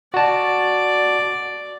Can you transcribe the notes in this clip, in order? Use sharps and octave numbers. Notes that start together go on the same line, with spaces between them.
F#4 D5 A5